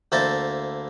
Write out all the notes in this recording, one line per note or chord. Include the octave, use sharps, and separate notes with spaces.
D2 A#3 E4 C5 A5